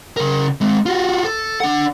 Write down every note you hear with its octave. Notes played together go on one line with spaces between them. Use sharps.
C#3 A#4
G#3 C4
F4 F#4
A4
D4 F#5